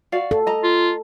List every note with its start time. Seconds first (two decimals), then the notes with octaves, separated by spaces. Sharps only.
0.12 F#4 D5 F5
0.31 A4
0.47 D#5 A#5
0.64 F4